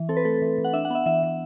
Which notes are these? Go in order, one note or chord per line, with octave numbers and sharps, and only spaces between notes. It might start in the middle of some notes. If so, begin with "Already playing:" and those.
Already playing: E3
C4 A4
B4
A3 A4
E3
E3
F#5
D4 E5
F#5
B3 E5
E3 E5
E3